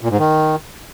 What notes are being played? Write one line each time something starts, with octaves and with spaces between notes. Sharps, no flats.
A#2
G#2
D#3